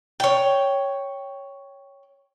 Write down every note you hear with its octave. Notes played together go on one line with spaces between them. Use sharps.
C#5 G5